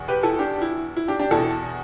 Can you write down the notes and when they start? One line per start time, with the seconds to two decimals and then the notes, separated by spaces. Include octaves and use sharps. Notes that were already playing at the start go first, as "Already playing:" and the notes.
Already playing: E2 B2
0.08 G4 B4
0.23 E4 A4
0.39 D4 G4
0.62 E4
0.97 E4
1.08 D4 G4
1.19 D4 G4
1.31 E2 B2 E4 A4